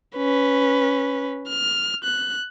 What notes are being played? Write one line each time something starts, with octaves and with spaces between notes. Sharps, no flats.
C#4 B4
F6
F#6